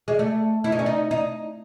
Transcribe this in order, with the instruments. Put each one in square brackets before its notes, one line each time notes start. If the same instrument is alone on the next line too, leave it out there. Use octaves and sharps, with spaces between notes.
[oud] G#3
A3
E4
D#4
C#4
D#4
D#4